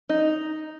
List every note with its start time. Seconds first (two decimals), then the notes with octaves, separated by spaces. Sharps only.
0.09 D#4